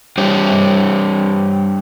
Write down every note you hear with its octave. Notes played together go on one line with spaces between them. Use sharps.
G3 D4 G4 C5 C#5